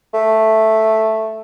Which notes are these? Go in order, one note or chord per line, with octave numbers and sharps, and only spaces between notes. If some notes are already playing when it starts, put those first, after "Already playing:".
A3